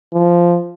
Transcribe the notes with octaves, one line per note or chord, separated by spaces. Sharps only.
F3